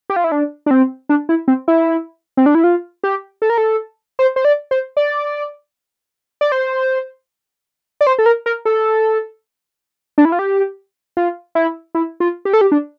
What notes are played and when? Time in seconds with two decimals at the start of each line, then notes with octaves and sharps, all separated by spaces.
0.10 G4
0.16 F4
0.24 E4
0.32 D4
0.66 D4
0.71 C4
1.09 D4
1.29 E4
1.48 C4
1.68 E4
2.37 C4
2.46 D4
2.55 E4
2.64 F4
3.04 G4
3.42 A4
3.50 A#4
3.58 A4
4.19 C5
4.36 C5
4.45 D5
4.71 C5
4.97 D5
6.41 D5
6.52 C5
8.01 D5
8.07 C5
8.19 A4
8.26 A#4
8.46 A#4
8.65 A4
10.18 D4
10.25 E4
10.32 F4
10.39 G4
11.17 F4
11.55 E4
11.95 E4
12.20 F4
12.45 G4
12.53 A4
12.61 G4
12.72 D4